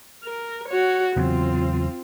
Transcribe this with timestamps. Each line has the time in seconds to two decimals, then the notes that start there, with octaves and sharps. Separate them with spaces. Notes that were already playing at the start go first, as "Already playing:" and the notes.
0.24 A#4
0.69 F#4 C#5
1.16 E2 C#3 F#3 C4 F4